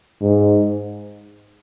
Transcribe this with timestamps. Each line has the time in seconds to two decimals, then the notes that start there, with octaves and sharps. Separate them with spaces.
0.22 G#2